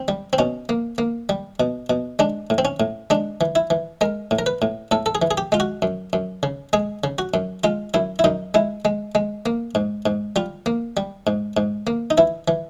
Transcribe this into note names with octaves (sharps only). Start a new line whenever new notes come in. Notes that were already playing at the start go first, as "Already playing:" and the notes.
Already playing: C4
G3
C4
B2 C#4
A#3
A#3
G3
B2
B2
G#3 D4
A2
C4
C#4
A2
G#3 D4
E3
E4
E3
G#3 A#4
A2
A#4
B4
A2
A2 A4
A4
G#4
E3
G#4
G4
G#3 F4
F#4
F#2
F#2
C#3
G#3 G#4
C#3
F#4
F#2
G#3 F4
F#2 E4
E4
F#2 D#4
G#3 E4
G#3
G#3
A#3
G#2
G#2
G3 F4
A#3
G3
G#2
G#2
A#3
D#4
E3 E4
E3